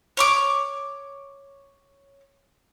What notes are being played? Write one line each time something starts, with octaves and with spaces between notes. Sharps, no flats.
C#5 C#6 D6